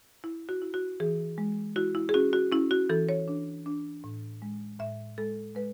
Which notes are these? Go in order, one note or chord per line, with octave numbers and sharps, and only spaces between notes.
E4
F#4
E4
F#4
E3 G#4
G#3
E4 F#4
E4
G#4
C#4 F#4
F#4
C#4 E4
F#4
E3 A4
C#5
D4
D4
A2
G#3
A2 E5
G#3 A4
G#3 B4